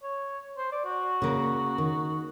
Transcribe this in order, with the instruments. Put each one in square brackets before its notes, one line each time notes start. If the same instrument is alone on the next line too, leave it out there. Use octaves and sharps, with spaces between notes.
[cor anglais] C#5
C5
D5
F#4
[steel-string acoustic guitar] C#3 A#3
D#3